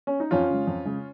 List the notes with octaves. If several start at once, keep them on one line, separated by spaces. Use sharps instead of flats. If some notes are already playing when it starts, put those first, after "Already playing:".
C#4
D#4
F2 C#4 F4
C#3 G#3
F2
C#3 G#3